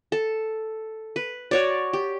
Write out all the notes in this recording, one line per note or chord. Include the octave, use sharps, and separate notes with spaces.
A4
B4
F#4 C#5 D5
G4